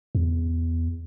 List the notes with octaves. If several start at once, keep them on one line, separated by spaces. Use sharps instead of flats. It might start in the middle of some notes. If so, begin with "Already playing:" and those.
E2